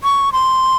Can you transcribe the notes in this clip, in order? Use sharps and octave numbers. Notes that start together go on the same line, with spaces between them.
C#6
C6